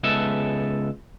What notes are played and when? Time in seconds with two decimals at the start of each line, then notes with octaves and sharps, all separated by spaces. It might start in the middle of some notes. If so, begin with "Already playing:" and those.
0.03 C#2 G#3 B3 A4 E5 A5